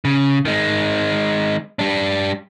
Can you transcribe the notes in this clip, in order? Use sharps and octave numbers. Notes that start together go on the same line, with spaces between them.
C#3
D#3 G#3
G3 D4